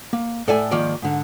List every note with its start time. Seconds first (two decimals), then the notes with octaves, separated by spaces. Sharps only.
0.13 A#3
0.48 A2 A4 D5 E5 G5 G#5
0.71 G#2 D#3 F3 A#3 D5
1.02 G#2 D3